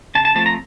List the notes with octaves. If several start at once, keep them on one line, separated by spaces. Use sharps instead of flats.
C#3 A5
A5
F3 A3 C4 A5
A#5